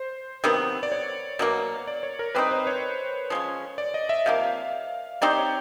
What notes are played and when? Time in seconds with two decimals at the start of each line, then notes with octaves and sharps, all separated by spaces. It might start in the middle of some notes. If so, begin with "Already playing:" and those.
Already playing: C5
0.44 C3 D#3 F#3 B3
0.83 D5
0.92 C#5
1.39 B2 F#3 A#3
1.87 D5
2.03 C#5
2.19 A#4
2.35 G3 C4 D#4 B4
2.51 C5
2.67 C#5
3.30 F3 G#3 C#4
3.78 D5
3.94 D#5
4.09 E5
4.26 C3 F3 A#3 F5
5.21 G3 C4 D#4 G4 D5
5.38 C#5